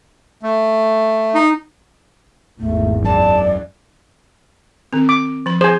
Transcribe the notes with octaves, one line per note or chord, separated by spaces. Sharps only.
A3
D#4
G#1 E2 A3
F#2 D5 A5
D#3 C4
D6
F3 B5
G#4 C5 G#5